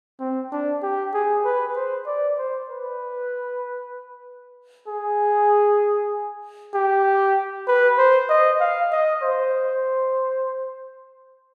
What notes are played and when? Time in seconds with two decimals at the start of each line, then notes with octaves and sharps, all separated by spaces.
0.20 C4
0.52 D4
0.82 G4
1.14 G#4
1.45 B4
1.76 C5
2.07 D5
2.38 C5
2.70 B4
4.88 G#4
6.74 G4
7.68 B4
7.98 C5
8.29 D#5
8.60 F5
8.92 D#5
9.23 C5